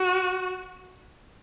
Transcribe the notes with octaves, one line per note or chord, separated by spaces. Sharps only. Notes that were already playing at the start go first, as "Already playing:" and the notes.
Already playing: F#4